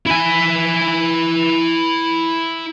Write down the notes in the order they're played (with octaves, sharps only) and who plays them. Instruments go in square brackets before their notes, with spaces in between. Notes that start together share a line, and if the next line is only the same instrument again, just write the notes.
[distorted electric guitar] E4 G#5